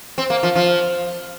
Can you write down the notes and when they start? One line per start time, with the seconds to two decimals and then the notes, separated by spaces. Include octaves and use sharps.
0.18 C4
0.30 A#3
0.43 F3
0.55 F3